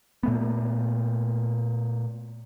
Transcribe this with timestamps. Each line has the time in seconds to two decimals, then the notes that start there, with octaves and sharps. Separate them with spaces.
0.23 A#2 A3 B3